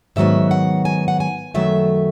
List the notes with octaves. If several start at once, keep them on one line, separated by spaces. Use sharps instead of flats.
G#2 D#3 F#3 B3 E5
F#5
G#5
F#5
G#5
F#2 D#3 F#3 A3 E5